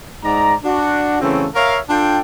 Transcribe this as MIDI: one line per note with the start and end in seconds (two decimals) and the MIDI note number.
0.23 0.54 44
0.23 0.54 63
0.23 0.54 74
0.23 0.54 82
0.64 1.20 62
0.64 1.20 66
1.22 1.47 49
1.22 1.47 52
1.22 1.47 54
1.22 1.47 57
1.22 1.47 60
1.22 1.47 61
1.56 1.79 70
1.56 1.79 73
1.56 1.79 76
1.56 1.79 77
1.90 2.19 62
1.90 2.19 65
1.90 2.19 69
1.90 2.19 79